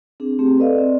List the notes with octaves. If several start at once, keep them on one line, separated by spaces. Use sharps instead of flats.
C4 D4 G#4
A3 C4 G4 G#4
A4 B4 D5 D#5 F5
C4 D5